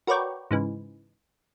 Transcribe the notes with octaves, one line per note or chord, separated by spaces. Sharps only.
F#4 A#4 B4 C#5 D5 G5
G#2 C#3 E3